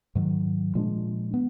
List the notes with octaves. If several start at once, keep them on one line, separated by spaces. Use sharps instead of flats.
G#2 D#3 F#3
A#2 F3 G#3 D4
B3